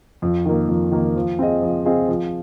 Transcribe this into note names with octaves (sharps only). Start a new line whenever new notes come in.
F2
D#3 A#3
F2
D#3 A#3
F3
C4 F4 G#4 D#5
F3
C4 F4 G#4 D#5
F3